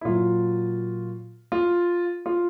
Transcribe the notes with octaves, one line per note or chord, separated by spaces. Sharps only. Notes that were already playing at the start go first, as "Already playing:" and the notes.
E4
A#2 F#3 F4
F4
F4